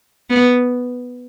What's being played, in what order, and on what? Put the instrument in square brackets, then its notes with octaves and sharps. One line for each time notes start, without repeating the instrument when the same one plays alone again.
[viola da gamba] B3